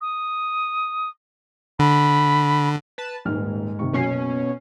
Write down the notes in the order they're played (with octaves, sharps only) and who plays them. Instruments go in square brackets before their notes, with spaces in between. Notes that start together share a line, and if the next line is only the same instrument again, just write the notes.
[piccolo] D#6
[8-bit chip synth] D3 [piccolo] B5
[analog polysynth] B4 A5
[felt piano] D#1 F6 [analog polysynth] G#2
[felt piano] C3 D#3 C#6
[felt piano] F#1 C7 [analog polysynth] B2 C#4